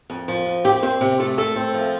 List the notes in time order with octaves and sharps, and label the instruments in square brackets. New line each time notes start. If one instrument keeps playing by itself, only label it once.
[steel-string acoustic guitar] F2
F3
F2
C4 G4
C4 C5
C3
A3 A4
A3 A4
C4
F3